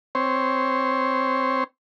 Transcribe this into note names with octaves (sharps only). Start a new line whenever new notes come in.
C4 C5 C#5